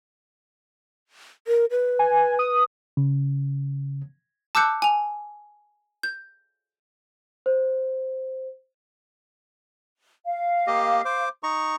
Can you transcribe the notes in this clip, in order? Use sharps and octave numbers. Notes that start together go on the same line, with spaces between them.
A#4
B4
G#5
D#6
C#3
A5 D6 E6 F#6 G6 C#7
G#5 F7
G6
C5
F5
A#3 G4 D#5
C5 D6
D#4 A#5 C#6